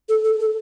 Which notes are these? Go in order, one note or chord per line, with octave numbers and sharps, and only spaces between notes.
A4
A4
A4